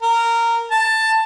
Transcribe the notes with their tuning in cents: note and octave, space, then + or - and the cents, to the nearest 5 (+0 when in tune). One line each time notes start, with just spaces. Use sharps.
A#4 -15
A5 +10